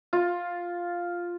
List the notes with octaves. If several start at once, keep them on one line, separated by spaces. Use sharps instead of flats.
F4